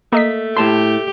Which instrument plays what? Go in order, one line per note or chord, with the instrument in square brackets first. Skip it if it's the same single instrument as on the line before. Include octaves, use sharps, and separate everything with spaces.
[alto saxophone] A3 [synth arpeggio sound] A#3 D#5 B6
[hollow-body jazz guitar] A2 A5 C6 [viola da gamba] G4